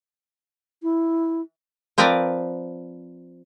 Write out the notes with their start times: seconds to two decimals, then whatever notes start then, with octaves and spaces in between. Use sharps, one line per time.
0.83 E4
1.98 F3 C4 A#4 B4 D5 A#5